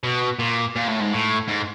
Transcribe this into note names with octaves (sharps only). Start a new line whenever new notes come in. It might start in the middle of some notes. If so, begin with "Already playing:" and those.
B2
A#2
A#2
A2
G#2
A2
G#2